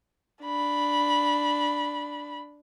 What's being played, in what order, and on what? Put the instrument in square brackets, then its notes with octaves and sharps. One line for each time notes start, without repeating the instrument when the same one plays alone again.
[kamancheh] D4 B5